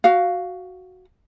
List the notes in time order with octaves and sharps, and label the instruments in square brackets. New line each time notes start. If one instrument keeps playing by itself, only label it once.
[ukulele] F#4 F5